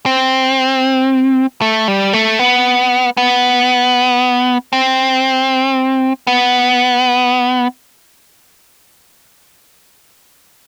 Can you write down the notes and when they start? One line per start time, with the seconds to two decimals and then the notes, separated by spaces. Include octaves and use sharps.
0.06 C4
1.61 A3
1.88 G3
2.13 A3
2.39 B3
3.17 B3
4.73 C4
6.27 B3